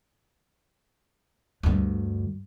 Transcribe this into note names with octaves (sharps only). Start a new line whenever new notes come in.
D2 G2